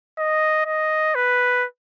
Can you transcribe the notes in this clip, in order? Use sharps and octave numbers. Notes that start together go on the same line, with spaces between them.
D#5
D#5
B4